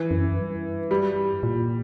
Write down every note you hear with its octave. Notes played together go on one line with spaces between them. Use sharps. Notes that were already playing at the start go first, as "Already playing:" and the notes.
Already playing: E3
F#2
G2
G3
A#2